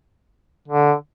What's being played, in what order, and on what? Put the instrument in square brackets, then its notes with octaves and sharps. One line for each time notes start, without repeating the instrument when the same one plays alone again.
[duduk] D3